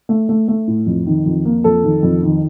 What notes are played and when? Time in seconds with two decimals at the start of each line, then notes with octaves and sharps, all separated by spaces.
0.09 A3
0.29 A3
0.48 A3
0.67 A2
0.86 F2
1.06 D#3
1.26 F2
1.45 A#3
1.64 F2 A4
1.84 D#3
2.03 F2
2.23 D#3